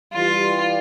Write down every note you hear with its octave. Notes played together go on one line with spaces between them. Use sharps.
E3 G3 F4